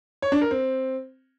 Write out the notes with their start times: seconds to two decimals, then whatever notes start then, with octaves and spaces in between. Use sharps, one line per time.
0.22 C#5
0.32 D4
0.41 A#4
0.51 C4